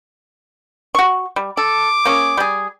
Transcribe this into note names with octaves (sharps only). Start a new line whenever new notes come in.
F#4 C#6
G3
A4 D6
A#3 C#4 G#4
G3 G#4